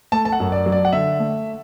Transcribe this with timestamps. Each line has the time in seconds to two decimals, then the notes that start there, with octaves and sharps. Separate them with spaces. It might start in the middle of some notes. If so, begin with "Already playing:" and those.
0.12 A3 A5
0.25 A5
0.32 F#5
0.40 F#2
0.52 D5
0.66 F#3
0.72 D5
0.85 F#5
0.93 D3 E5
1.19 A3